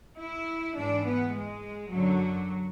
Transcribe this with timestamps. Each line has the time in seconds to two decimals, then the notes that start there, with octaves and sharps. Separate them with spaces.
0.18 E4
0.76 G#2 E3 D4
1.05 B3
1.34 G#3
1.91 F#2 D3 F#3